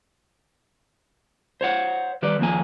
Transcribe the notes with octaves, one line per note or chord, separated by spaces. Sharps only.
C5 C#5 F#5
D#3 G3 B4 D5
D#2 F3 A#3 G#5